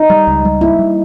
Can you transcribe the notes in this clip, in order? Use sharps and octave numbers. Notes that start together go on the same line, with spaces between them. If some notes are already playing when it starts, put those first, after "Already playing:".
Already playing: D#4
G3
C#2
G3
A#3 E4
G3